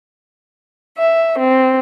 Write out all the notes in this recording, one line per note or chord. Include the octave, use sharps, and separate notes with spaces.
E5
C4